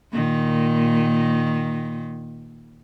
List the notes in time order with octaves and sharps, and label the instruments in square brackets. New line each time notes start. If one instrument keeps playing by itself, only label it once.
[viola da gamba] A#2 D#3